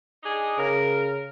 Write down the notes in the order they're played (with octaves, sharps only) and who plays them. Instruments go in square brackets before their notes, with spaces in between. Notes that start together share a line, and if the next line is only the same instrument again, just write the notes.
[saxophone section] D4 D#4 G#4
[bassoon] C#3 [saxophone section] A#4